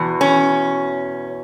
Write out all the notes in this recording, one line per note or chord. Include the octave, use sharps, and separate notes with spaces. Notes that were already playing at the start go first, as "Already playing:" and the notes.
Already playing: E2 B2
C#4